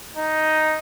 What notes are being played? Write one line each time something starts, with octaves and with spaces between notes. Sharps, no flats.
D#4